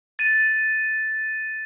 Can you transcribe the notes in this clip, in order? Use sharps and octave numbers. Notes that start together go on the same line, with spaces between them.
A6 D#7